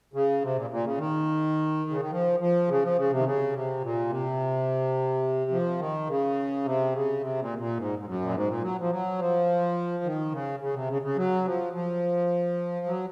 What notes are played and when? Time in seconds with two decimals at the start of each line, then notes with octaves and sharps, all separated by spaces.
0.14 C#3
0.42 C3
0.56 A#2
0.70 A#2
0.84 C#3
0.98 D#3
1.90 C#3
2.01 D#3
2.11 F3
2.40 F3
2.69 C#3
2.82 F3
2.97 C#3
3.10 C3
3.19 D#3
3.25 C#3
3.53 C3
3.82 A#2
4.09 C3
5.51 F3
5.79 D#3
6.07 C#3
6.64 C3
6.92 C#3
7.20 C3
7.40 A#2
7.58 A#2
7.77 G#2
7.99 G#2
8.06 F#2
8.21 A#2
8.34 G#2
8.48 A#2
8.62 F#3
8.80 F3
8.91 F#3
9.18 F3
10.03 D#3
10.32 C#3
10.60 C#3
10.74 C3
10.88 C#3
11.02 C#3
11.17 F#3
11.45 F3
11.73 F3
12.86 F#3